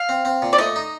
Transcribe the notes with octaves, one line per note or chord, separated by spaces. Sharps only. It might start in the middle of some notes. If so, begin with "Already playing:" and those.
Already playing: F5
C4
C4
A#2
D5
A3 D#5
D#4